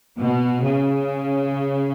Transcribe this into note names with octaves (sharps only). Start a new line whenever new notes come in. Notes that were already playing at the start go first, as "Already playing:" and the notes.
B2
C#3